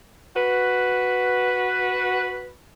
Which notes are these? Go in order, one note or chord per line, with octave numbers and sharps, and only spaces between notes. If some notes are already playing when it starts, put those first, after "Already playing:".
F#4 B4